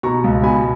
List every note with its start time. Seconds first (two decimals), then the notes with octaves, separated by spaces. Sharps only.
0.03 B2 A#5 C#6
0.24 C#2
0.43 B2 G#5 B5